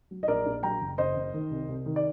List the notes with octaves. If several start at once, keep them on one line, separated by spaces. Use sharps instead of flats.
F#3
D#5
A#1 A#4 D5
A#1
F#3 G5 A#5
F#1
F#1 C5 D#5
F#1
D#3
C2
C2
D#3
D5